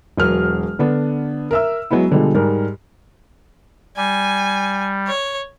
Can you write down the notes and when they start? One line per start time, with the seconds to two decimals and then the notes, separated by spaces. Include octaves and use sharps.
0.17 E1 F#3 A#4 F6
0.79 D3 B3 D4
1.51 A#4 E5 E6
1.91 F#3 G#3 B3 E4
2.11 B2 D3 F3 G3 G#3
2.35 G#2 G3 A#4
3.97 G3 G#5
5.07 C#5